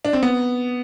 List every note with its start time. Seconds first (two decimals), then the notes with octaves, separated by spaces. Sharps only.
0.05 D4
0.13 C4
0.23 B3